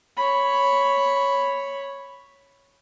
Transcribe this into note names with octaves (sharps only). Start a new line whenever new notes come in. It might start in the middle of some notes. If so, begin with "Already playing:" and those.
C#5 B5